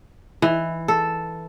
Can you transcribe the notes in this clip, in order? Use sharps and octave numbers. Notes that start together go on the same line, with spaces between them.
E3
A4